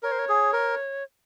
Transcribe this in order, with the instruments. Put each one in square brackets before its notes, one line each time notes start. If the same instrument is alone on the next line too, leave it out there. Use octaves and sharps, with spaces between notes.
[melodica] A#4 [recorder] C#5
[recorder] C5
C#5
[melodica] G#4
A#4